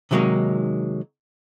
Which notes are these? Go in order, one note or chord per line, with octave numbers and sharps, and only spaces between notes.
C3 D#3 F#3 G#3 A#3 D#4